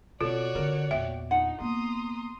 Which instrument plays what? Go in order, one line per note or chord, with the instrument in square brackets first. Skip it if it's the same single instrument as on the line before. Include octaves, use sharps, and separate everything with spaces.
[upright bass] B2 C4 [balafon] F4 [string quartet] F#4 C#5 D5 [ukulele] A4
[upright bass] D3 C4 [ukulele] A4 A#4
[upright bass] E2 A#2 [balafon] E5 [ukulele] G5
[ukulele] D4 F4 F#5 [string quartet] D#4
[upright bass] A#3 B3 [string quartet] A#5 C6 D#6